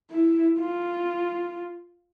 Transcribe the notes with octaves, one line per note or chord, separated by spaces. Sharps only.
E4
F4